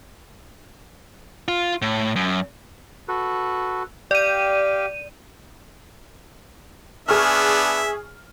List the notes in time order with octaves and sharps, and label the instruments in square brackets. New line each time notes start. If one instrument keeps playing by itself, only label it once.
[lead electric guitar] F4
A2
F#2
[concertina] F#4 A4 B4
[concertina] G4 F5 G5 [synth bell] D5 D#7
[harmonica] B3 D4 E5 [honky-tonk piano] G#4 C#6 F6